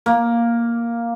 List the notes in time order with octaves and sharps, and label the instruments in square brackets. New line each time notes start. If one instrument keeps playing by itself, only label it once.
[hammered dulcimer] A#3